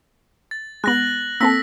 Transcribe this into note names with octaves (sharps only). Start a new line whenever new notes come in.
A6
G#3 B3 F#6 A#6 F#7
A#3 C4 A4 E6 A#6 B6